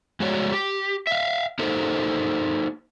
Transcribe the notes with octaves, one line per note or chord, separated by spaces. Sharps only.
G#3 A3 F#4 C#5 D5
G4
E5 F5
A#3 D#4 A4 A#4 C5